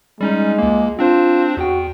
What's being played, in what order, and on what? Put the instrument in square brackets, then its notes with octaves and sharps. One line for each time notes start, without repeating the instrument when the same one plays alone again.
[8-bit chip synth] G3 C#4 D#4 [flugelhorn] G#3
[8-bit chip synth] C#2 A#3
[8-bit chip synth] C4 D4 C5 [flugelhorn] F4
[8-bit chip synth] E2 G5 [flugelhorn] F#4